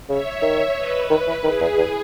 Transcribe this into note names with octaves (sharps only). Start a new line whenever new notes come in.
C#3 C#5 E5
D#3
B4 D#5
D#3
E3
D#3 E4 G#4
E2
E2